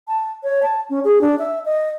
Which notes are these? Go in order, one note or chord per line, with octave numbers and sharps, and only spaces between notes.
A5
C#5
A5
C#4
G#4
D4
E5
D#5